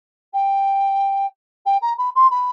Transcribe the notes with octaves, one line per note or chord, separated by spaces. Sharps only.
G5
G5
A#5
B5
C6
B5